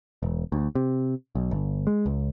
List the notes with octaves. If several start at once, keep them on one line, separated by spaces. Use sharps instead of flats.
E1
D2
C3
B1
G1
G#3
C#2